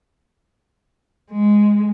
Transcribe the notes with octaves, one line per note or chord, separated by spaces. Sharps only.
G#3